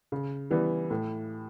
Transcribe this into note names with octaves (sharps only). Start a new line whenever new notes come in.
C#3
E3 G3 B3
A2